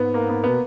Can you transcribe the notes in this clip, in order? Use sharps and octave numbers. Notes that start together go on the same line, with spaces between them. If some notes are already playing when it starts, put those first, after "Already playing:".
Already playing: G#2 B3
A#3
B3
B2 B3